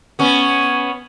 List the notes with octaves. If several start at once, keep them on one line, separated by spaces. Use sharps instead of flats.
B3 C#4